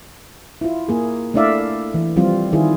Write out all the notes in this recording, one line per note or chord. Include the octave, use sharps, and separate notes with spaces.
E4 F4
A#3 G#4
A3 D4 E4 D5 E5 F5
E3
F3 G3 C4 F4
D#3 E4 F4 G#4